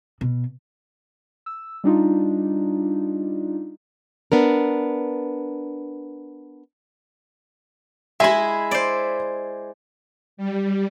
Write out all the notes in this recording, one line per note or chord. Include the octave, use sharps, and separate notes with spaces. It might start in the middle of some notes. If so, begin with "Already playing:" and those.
B2
E6
G3 D4 D#4 F4
B3 D4 A#4
G#3 E4 E5 G#5 B5
C5 D5
G3